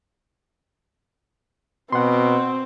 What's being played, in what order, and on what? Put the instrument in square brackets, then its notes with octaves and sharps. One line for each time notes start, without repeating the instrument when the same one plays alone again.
[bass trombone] B2 [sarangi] C4 [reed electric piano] F#5 C6